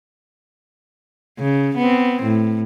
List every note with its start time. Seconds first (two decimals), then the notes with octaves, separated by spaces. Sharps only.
1.39 C#3
1.77 B3 C4
2.23 A2